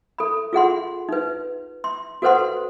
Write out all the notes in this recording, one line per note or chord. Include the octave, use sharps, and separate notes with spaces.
A4 B5
F4 G#4 F#5 C6
D#4 B4
C6
F#4 A4 B4 C5 F#5 C6